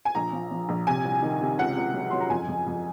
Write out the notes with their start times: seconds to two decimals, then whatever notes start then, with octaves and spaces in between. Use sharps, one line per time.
0.05 G#5
0.15 A#1 A#5
0.33 F3
0.51 F3
0.69 A#1
0.87 C3 G#5
1.04 C2
1.22 D#3
1.41 C3
1.58 C#2 F#5
1.77 C#2
1.94 F#3
2.10 F#3 C6
2.20 A#5
2.30 F2 G#5
2.48 F2
2.67 F2